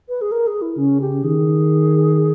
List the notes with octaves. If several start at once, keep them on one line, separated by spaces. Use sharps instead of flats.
B4
G#4
A#4
G#4
E4
C#3 C#4
G4
D#3 G#4